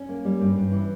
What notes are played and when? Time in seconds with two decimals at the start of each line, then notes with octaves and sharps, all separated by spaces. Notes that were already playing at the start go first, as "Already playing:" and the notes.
Already playing: C#4
0.09 A#3
0.25 G3
0.40 G2
0.56 G2
0.72 E3